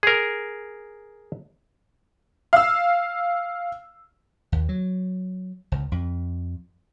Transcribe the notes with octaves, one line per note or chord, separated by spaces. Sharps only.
G#4 A#4
F5 E6
D#2
F#3
C#2
F2